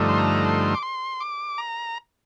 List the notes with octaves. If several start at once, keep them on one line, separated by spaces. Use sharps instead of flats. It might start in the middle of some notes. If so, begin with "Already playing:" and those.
Already playing: G2 D3 F3 A3 D#4
C6
A#5
C6
D6
C6
D6
A#5